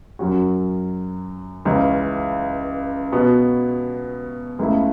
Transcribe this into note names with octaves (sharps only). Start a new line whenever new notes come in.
F#2 F#3 C#4 F#4
C#2 C#3 E3 C#4
B2 B3 F#4
C#2 C#3 A3 E4